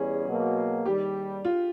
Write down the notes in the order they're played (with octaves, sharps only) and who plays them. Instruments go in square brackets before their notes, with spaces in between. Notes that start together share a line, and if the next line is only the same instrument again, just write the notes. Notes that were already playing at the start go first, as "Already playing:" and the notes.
Already playing: [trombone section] E2 G3 C#4 [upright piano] G#4
[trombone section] B2 F#3 A#3
[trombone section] D#2 D#3 G3 [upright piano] G4
[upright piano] F4